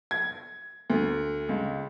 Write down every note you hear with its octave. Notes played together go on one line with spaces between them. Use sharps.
G#6
D2
C#2